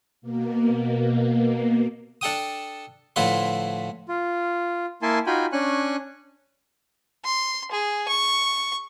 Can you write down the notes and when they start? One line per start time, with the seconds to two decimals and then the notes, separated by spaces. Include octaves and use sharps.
0.21 B2 A#3
2.21 D4 A4 G5 D#6
3.16 A2 D3 F3 E4 B4 C6
4.08 F4
5.02 A#3 E4 G#5 A5 C6
5.27 D#4 F4 F#4 G5 G#5 B5
5.52 C#4 D4 G#5 C#6 F#6
7.24 C6
7.71 G#4
8.08 C#6